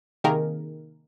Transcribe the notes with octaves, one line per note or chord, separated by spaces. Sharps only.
C3 D#3 A#3 G#4 A#4